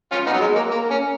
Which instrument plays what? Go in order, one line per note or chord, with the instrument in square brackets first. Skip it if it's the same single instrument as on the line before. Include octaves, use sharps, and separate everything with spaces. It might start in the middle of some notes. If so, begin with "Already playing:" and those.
[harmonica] C#4 F4
B3 D#4
F#3
G#3
A#3
A#3
C#4